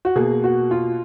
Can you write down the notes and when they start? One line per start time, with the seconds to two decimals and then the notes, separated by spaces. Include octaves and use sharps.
0.05 F#4
0.15 B2 A#3 G#4
0.44 F#4
0.71 F4